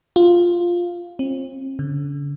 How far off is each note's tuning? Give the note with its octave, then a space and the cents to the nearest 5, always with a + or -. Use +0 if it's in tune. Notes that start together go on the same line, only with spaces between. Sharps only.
F4 +0
C4 +35
D3 -45